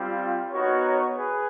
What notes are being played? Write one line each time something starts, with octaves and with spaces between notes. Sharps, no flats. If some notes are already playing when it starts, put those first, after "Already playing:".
Already playing: G3 C4 F4
B3 D#4 F#4 A#4 C#5
G#4 B4